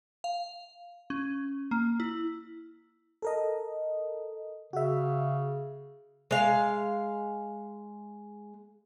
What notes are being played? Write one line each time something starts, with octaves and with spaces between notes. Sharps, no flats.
F5
C#4
A#3
E4
A4 A#4 D#5
C#3 F#4 E5
G#3 F5